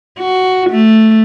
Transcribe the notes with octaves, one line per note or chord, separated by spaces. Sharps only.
F#4
A3